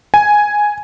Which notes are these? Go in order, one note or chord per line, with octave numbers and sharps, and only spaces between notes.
G#5